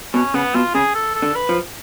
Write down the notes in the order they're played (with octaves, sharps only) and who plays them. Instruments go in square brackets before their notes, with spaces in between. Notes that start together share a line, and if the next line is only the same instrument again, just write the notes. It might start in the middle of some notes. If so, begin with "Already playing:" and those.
[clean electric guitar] B2 [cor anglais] C#4
[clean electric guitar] C#3 [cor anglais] B3
[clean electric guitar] B2 [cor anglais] F4
[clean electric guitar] C#3 [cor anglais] G#4
[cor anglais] A4
A4
[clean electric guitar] D3
[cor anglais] B4
[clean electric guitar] F3